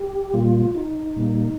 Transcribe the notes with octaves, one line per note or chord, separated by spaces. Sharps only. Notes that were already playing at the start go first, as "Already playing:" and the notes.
Already playing: G4
A#2 G3 A#3 F4
D#4
A#2 G3 A#3